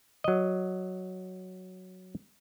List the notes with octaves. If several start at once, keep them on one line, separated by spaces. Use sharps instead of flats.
F#3 D#5